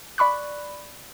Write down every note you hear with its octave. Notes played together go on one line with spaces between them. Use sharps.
D5 B5 C#6 F#6